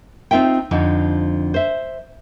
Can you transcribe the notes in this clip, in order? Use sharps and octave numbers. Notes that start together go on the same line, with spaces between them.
C4 D#4 F4 E5 G5
F2 D3 F3 D#4
C5 E5